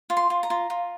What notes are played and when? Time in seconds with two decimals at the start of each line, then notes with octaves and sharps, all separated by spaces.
0.10 F4
0.17 C6
0.30 F4
0.43 A#5
0.50 F4
0.70 F4